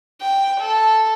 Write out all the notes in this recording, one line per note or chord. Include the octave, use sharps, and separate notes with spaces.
G5
A4